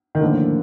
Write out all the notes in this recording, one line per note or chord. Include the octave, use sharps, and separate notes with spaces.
D#3
A2 D3 F3 A#3